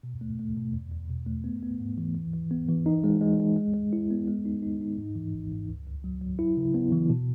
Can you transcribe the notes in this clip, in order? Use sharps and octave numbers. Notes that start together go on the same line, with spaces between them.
B2
A3
A3
B2
E2
E2
B2
A3
B3
B3
G#2
E3
E3
E3
B3
E3
D#4
G#3
G#3
G#3
G#3
G#3
E4
B3
G#3
D#4
D#4
D#4
G#2
E3
G#1
G#2
C#2
C#2
F#3
F#3
E4
C#3
B3
E3
B2